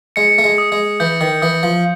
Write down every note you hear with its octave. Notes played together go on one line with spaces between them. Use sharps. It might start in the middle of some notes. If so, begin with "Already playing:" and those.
G#3 C#7
A3
G#3
D#6
G#3
E3 G6
D#3
E3 D#6
F3